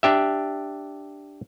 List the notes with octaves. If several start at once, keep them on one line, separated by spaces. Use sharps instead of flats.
D4 G4 E5